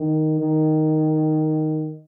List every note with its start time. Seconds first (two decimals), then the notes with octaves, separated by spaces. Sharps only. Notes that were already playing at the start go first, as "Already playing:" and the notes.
Already playing: D#3
0.39 D#3